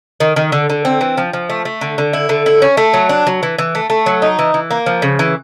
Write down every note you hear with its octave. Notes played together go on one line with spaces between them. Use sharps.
D#3
D#3
D3
D3
C4
E3
F3
F3
A3
A3
D3
D3
E4
D3
E4
C#4
A3
F#3
D4
F#3
E3
E3
A3
A3
F#3
D#4
E3
E3
A#3
F3
C#3
E3